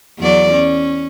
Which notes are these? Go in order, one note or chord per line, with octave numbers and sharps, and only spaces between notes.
E2 F#3 D5
C#4